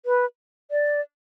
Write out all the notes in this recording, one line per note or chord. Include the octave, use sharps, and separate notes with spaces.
B4
D5